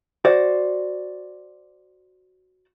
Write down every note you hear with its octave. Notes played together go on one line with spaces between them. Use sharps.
F#4 C5 D5